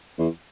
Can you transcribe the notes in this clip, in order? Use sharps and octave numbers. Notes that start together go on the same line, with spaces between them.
E2